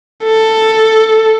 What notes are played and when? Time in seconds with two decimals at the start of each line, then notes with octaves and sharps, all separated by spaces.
0.24 A4